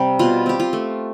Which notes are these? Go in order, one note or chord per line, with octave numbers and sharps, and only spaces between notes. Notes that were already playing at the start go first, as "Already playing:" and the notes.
Already playing: C3 G3 C4
B2 F4
C4 G4
F4
A3